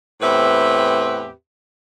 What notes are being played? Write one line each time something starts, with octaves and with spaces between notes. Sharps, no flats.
E2 A2 C4 G4 B4 E5